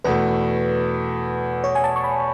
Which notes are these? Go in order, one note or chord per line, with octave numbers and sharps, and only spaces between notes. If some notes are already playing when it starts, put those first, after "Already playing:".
E2 B2 A3 B4
C#5
G#5
A5
C#6
B5